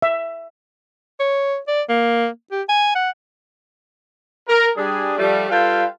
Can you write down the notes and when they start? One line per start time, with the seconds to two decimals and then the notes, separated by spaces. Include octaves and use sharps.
0.02 E5
1.20 C#5
1.68 D5
1.89 A#3
2.52 G4
2.69 G#5
2.95 F#5
4.48 A#4
4.76 G3 D4 G#4
5.18 F3 G3 A3
5.50 G3 F4 A4 B4 F5 G5